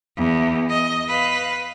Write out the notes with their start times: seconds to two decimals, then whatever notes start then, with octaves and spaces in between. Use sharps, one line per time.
0.18 E2
0.70 D#5
1.08 B4 F5